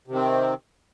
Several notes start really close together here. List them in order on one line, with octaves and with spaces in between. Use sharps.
C3 D#3 C4